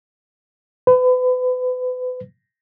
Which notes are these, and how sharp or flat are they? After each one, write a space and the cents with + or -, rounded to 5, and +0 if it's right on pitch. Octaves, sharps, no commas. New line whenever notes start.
B4 +35